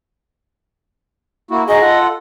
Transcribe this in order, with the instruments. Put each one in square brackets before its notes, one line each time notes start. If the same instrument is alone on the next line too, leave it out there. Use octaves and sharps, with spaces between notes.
[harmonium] A#3 E4 F#4
[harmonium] D#4 F#4 G#4 [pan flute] D#5
[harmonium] F4 A4 F#5